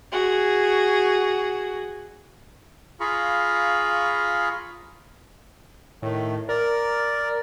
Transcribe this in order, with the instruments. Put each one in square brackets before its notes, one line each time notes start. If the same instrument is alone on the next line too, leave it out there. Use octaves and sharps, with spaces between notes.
[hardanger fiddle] F#4 G#4
[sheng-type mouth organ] F4 G#4 F5 A#5 B5 C#6
[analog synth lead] A2 [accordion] D#3 A3
[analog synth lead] A#4 [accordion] D5